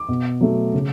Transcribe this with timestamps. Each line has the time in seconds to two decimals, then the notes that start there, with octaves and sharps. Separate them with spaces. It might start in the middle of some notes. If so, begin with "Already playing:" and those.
Already playing: D6
0.08 B2
0.41 F#3 A3
0.74 C#3